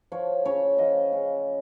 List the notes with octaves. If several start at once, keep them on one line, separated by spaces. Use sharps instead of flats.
F3 C#5
C#3 C#5
F3 D#5
C#3